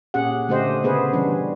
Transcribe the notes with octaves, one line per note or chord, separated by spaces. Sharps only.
A#2 C#4 G4 G#4 F#5
D3 A3 C#4 G4 C5 D#5
C#3 B3 G#4 B4 C5
E3 G3 C#4 D4